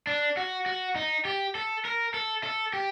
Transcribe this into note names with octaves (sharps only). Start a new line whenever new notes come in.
D4
F#4
F#4
D#4
G4
A4
A#4
A4
A4
G4